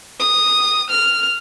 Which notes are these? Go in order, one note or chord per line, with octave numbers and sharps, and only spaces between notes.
D#6
F6